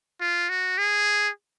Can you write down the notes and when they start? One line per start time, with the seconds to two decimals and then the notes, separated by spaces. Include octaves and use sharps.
0.21 F4
0.49 F#4
0.78 G#4